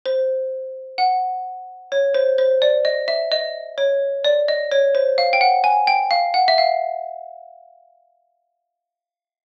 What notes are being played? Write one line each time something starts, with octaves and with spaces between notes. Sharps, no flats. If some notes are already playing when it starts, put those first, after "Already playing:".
C5
F#5
C#5
C5
C5
D5
D#5
E5
D#5
C#5
D5
D#5
C#5
C5
F5
G5
F#5
G#5
G5
F5
F#5
E5
F5